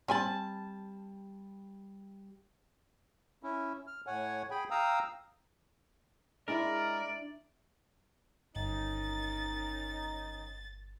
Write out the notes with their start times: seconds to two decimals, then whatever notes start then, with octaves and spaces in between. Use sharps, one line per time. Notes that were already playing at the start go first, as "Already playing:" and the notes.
0.08 G3 C4 G#5 A5 B5
3.43 C#4 E4
3.87 F6
4.07 A2 C#5 F#5 G#5
4.50 G#4 G5 G#5 B5
4.71 F5 G5 A#5 D#6 E6
6.48 G#3 D4 E4 A#4 D5
8.56 G1 D#3 C#4 D#4 A6